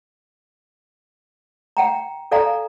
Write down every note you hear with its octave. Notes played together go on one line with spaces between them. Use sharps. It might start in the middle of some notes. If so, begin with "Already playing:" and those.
F#5 G5 A#5
A4 D5 F5 G#5 A#5